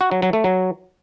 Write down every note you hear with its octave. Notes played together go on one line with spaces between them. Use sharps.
F#4
F#3
F#3
A3
F#3